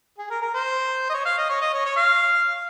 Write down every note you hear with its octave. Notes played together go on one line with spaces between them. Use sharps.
G#4
A#4
A#4
C5
D#5
C#5
F5
D#5
C#5
D#5
C#5
C#5
F5